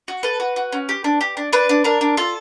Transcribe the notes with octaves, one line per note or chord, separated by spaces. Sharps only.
F#4
A4 B4
F#4
F#4
C#4
G4
D4
G4
D4
D4 B4
D4
D4 A#4
D4
F4 A4